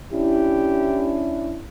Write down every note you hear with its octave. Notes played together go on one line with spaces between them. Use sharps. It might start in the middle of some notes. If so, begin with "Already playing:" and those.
C#4 D4 E4 G4